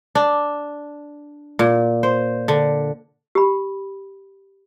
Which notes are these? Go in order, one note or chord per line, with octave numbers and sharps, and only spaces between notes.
D4
A#2
C5
D3
G4 B5